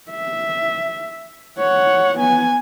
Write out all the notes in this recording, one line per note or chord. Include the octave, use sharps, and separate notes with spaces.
E5
C#5 F#5
B3 G#5